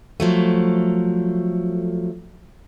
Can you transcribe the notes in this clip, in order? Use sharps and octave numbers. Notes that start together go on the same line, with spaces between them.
F3 F#3 A3